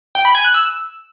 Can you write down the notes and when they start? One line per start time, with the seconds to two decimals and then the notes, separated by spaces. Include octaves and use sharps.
0.15 G5
0.25 B5
0.35 G#5
0.45 F#6
0.54 E6